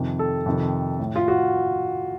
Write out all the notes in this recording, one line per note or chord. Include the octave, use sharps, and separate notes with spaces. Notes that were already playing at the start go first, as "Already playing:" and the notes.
Already playing: F2 C3 D#3
A4
F2 C3 D#3
A2
F4
F#4